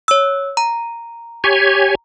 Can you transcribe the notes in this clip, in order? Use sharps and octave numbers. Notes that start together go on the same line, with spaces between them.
C#5 E6
A#5
G4 C#5 G#5